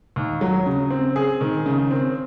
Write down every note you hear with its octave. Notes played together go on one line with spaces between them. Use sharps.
D#2
F#3
C#3
C4
G#4
D#3
C#3
C4